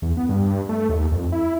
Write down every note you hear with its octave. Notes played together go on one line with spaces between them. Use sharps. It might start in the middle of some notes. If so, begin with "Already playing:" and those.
E2
B3
G2
A3
D#2
F2
E4